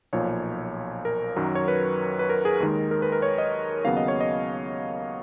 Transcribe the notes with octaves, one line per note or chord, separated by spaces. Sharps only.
B1 A#2 F3 C#5
A#4
F#2 D#3 F#3
C#5
B4
B4
A#4
G#4
D#2 D#3 G#3 A#4
A#4
B4
A#4
C#5
D#5
D#2 C#3 F#3 B3 F5
D#5
C#5
D#5